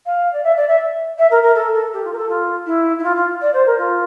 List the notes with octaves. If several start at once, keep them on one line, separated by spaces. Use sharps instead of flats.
F5
D5
E5
D5
E5
E5
A#4
A#4
A4
A4
G4
F4
A#4
A4
F4
E4
E4
F4
F4
D5
C5
A#4
F4